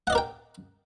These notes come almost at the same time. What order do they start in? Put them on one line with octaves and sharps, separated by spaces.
F#5 D#5 D5 A#4 G5